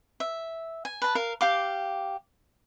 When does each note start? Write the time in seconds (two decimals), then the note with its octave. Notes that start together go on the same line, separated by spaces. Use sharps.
0.20 E5
0.85 G#5
1.02 B4 A5
1.15 A#4 F5
1.41 G4 F5 D6